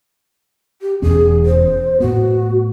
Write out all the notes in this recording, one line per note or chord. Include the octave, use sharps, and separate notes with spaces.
G4
E1 E2 C#4 G#4
C5
A2 B3 F#4